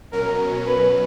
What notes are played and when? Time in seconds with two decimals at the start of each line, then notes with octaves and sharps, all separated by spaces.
0.13 B2 F#3 C#4 A#4
0.67 B4